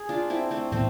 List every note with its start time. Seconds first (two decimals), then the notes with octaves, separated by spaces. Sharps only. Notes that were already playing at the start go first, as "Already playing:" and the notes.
Already playing: G#4
0.09 D4 F4
0.30 C4 E4
0.51 A3 C4
0.72 A2 E3 A3 B3 C4